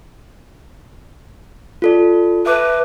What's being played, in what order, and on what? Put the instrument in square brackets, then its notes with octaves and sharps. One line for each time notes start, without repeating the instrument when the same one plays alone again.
[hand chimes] F4 A4 D5
[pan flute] B4 [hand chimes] E5 A5 D6